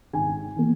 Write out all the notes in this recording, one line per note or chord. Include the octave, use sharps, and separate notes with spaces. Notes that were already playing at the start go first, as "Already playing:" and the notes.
G#1 G#5
E3 A#3